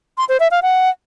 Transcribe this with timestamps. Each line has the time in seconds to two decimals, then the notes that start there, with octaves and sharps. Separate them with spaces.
0.18 C6
0.29 C5
0.40 E5
0.51 F5
0.62 F#5